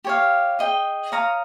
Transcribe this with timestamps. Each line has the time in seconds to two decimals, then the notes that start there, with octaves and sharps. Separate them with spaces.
0.04 G4 C#5 F5
0.59 G#4 D#5 G5
1.12 C#5 F5 A#5 D#6